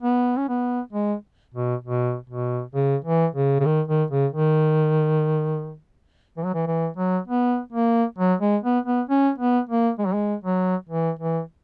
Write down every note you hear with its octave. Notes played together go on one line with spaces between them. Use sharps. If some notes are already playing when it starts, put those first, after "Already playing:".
B3
C#4
B3
G#3
B2
B2
B2
C#3
E3
C#3
C#3
D#3
D#3
C#3
D#3
E3
F#3
E3
E3
F#3
B3
A#3
F#3
G#3
B3
B3
C#4
B3
A#3
G#3
F#3
G#3
F#3
E3
E3